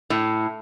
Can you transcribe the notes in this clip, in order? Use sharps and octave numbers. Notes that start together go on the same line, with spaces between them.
A2